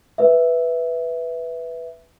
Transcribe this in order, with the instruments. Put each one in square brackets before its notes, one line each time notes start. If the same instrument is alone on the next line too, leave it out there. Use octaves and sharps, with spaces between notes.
[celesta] B4 E5